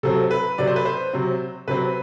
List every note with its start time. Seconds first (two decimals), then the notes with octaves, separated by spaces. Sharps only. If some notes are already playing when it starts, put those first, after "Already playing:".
0.03 C3 F#3 C4 A4
0.31 B4
0.58 C3 F#3 C4 D5
0.67 C5
0.76 B4
0.85 C5
1.13 C3 F#3 C4
1.68 C3 F#3 C4 B4